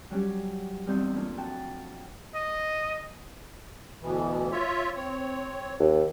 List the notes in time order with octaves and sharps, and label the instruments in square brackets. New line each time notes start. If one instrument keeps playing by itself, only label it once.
[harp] F#3 G3 C#4 G4
E2 G2 G3 C4 D#4 G6
A3 A#3 C#4 D4 F4
F2 F#4 G5 A5
[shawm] D#5
[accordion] D2 B2 E3
F4 C#5 E5
C4 C#5
[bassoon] D#2